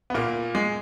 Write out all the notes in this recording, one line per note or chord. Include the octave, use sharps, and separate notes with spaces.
B3
A#2 A#3
G#3